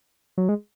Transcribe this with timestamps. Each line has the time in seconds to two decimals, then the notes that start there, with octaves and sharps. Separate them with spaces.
0.38 F#3
0.49 G#3